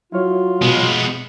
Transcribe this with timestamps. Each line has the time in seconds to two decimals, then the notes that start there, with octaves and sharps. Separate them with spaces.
0.12 F#3 E4 F4 C#5
0.62 B2 G#3 B3